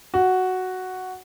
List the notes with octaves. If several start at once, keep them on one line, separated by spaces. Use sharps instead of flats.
F#4